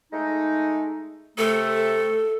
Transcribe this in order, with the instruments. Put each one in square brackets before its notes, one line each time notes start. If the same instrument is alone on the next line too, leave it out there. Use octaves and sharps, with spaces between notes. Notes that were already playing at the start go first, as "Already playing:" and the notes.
[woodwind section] G#3 A3 D#4
[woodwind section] C3 A3 [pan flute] A4